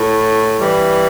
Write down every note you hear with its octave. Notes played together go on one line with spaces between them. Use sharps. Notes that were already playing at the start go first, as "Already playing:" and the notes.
Already playing: A2
E3 G3